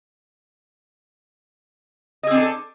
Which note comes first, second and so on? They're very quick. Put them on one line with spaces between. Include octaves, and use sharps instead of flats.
D#5 G#4 C4 D4 A4